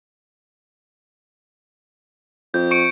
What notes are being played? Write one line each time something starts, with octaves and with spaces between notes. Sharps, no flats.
F2 G6
C#6 C#7 D7